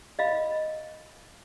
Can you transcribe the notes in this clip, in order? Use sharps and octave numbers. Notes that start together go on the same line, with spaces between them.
D#5 F5 B5